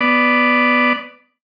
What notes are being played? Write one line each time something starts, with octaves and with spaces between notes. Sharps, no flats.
B3 D5